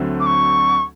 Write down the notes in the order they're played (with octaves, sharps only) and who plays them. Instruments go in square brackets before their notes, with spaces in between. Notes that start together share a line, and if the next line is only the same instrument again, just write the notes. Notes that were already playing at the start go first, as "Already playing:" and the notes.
Already playing: [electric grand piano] D2 D3 F#3 A3 C4
[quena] D6
C#6